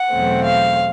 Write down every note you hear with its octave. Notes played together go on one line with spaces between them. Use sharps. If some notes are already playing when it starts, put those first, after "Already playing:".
Already playing: F#5
E2 B2 F#3 A3 C4
F5